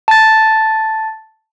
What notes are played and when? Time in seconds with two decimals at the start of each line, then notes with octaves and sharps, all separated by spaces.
0.08 A5 A6